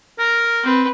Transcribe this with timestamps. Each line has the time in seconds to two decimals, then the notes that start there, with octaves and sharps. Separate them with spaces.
0.19 A#4 A#5
0.63 C4 B4